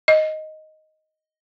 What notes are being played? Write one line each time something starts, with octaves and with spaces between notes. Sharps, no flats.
D#5